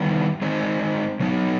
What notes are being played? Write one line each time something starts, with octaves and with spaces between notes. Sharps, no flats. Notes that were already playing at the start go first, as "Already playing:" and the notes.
Already playing: D#3 G3 B3 E4 G4
G#3 C4 D#4
B2 F#3 B3 D#4